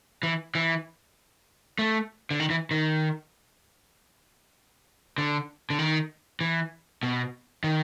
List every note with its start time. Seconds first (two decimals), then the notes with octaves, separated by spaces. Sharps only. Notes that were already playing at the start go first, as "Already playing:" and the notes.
0.23 E3
0.55 E3
1.79 A3
2.31 D3
2.40 D#3
2.50 E3
2.71 D#3
5.18 D3
5.70 D3
5.79 D#3
6.41 E3
7.03 B2
7.64 D#3